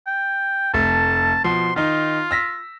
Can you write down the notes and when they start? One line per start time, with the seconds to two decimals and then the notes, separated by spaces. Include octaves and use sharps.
0.07 G5
0.74 F1 A3 A5
1.44 B2 F3 C6
1.76 D#3 D#4 F4
2.31 E6 A#6 B6